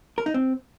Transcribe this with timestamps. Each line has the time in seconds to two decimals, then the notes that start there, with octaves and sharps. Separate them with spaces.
0.18 A#4
0.26 D#4
0.34 C4